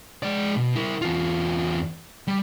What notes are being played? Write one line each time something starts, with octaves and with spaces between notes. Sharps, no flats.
G#3 D5
B2
E4 A#4
E2 F4
G3